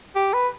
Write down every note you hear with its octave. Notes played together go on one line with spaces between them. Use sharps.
G4
B4